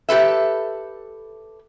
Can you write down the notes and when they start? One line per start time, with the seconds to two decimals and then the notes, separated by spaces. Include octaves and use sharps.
0.09 G4 A4 B4 E5